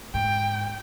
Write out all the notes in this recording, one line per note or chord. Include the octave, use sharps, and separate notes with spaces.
G#2 G5